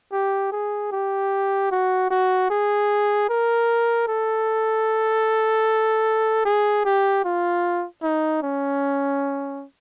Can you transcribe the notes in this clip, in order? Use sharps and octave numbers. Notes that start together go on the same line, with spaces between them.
G4
G#4
G4
F#4
F#4
G#4
A#4
A4
G#4
G4
F4
D#4
C#4